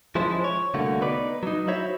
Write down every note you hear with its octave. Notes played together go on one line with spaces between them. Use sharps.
F3 G#3 C#4 E4 C5
C#5
C2 D3 A3 A#3 F#4
B3 D#4 B4 D5
F#3 D#4
E4 F#4 C5 C#5 E5